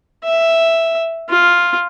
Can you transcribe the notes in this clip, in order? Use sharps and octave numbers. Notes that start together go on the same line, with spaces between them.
E5
F4